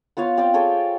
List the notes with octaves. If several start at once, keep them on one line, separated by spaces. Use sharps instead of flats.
B3 F4 C#5 F5
C4 D5 F5 G5
G#4 A4 C#5 G5